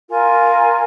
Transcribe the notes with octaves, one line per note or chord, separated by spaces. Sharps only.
F4 A#4 G#5